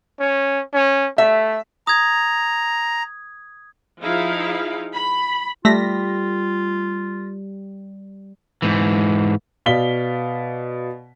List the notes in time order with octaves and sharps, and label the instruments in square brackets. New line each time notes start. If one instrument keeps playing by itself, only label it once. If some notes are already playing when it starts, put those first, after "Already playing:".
[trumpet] C#4
C#4
[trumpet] A3 [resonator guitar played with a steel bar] E5
[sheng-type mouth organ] A#5 [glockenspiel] D#6 G#6
[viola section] F3 D#4 E4 G#4 F5
B5
[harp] G3 [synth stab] A3 A#6 B6 [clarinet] F4
[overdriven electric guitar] G#2 E3
[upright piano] B2 D5 F5 B6 G7